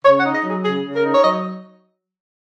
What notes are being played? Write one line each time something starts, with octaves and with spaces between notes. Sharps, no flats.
C#3 C#5
F#5
D#4
D#5
F#3
G#4
C#3 G#4
C#3
A#4
D#4
C#5
F#3 D#5